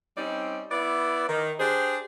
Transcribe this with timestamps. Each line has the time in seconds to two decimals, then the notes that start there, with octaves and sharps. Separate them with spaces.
0.17 G3 C4 C#4 D#4 D5
0.71 B3 E4 D5
1.29 D#3
1.60 D4 G4 G#4 C5